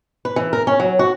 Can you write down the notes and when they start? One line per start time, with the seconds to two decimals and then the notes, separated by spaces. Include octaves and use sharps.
0.25 B4
0.36 E3
0.53 A#4
0.67 C#4
0.80 F#3
0.99 F#4